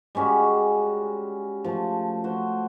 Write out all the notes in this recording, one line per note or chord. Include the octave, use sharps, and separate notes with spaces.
G3 G#3 C#4 F#4
F3 A3
F#4 C5